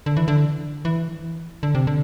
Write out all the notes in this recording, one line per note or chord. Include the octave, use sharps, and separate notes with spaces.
D3
E3
D3
E3
D3
C3
D3